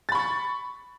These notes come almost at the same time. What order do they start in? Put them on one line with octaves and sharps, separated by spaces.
A6 B5 C#6